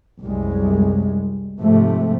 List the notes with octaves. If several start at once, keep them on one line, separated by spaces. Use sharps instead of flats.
C2 F#2 G3 G#3
G#2 C3 F3 A3